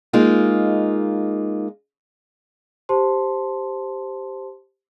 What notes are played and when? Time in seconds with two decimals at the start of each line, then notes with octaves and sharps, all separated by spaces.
0.13 G#3 A#3 D#4 F4
2.89 G4 C5 A5 C6